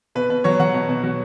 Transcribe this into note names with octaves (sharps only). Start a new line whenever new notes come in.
B2 B4
B2 B4
F#3 C#5
F#3 F#5
B2
B2
F#3